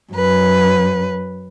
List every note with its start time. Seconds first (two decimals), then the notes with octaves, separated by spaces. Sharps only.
0.12 F#2 B4